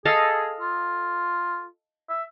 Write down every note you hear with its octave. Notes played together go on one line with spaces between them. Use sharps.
G#4 A4 D#5 F5
F4
E5